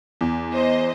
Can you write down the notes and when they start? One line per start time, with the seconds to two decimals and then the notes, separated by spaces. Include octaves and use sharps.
0.21 E2
0.53 C5 D#5